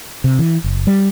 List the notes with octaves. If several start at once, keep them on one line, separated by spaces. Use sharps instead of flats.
C3
E3
F#1
G3